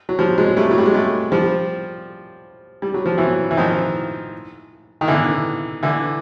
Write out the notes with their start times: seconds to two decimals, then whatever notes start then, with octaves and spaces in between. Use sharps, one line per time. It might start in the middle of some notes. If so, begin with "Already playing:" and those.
0.09 F#3
0.19 F3 G3
0.38 F#3 G#3
0.57 G3 A3
0.71 F#3
0.78 G3
0.86 G#3
0.94 G3 A3
1.32 F3 G3
2.82 G3
2.94 F#3
3.06 F3
3.18 E3 F#3
3.51 E3
3.57 D#3 F3
5.01 D#3
5.07 D3 E3
5.83 D3 E3